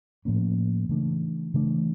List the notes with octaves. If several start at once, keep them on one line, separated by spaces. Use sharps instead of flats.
A2 F3 A#3 C#4
C#3 E3 A3 D4
C#3 E3 A3 D4